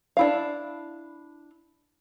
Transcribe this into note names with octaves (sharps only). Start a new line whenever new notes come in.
D4 E4 F5